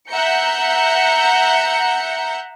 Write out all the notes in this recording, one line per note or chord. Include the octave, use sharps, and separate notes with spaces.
E5 F#5 A#5 G6 C#7